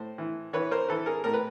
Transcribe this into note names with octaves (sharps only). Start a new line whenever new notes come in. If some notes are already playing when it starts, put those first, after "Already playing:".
Already playing: A2 C5
E3
E3 B4 C#5
A#4 C5
E3 A4 B4
G#4 A#4
A2 A#4
B4